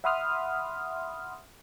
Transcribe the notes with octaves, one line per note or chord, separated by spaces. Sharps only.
E5 F#5 B5 C6 D#6 F6